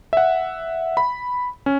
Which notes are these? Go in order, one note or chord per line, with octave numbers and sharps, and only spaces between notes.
E5 F#5
B5
C#4